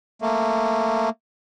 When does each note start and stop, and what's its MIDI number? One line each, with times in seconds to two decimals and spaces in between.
0.22 1.09 57
0.22 1.09 58